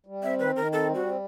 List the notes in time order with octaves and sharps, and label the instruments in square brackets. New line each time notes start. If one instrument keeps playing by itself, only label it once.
[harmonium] G3
[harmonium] C4 [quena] E5
[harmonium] D#3 [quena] B4
[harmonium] D#3 [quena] A#4
[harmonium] C4 [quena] A4
[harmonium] G3
[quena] F#4
[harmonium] C4